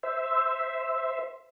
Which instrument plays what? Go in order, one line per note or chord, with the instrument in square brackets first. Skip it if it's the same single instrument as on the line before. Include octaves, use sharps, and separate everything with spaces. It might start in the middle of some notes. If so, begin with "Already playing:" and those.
[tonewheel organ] C5 E5